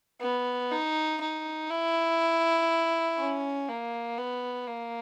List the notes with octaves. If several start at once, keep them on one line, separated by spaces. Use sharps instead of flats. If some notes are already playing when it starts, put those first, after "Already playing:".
B3
D#4
D#4
E4
C#4
A#3
B3
A#3